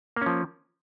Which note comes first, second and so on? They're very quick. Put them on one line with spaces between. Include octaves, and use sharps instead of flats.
A#3 C#4 F3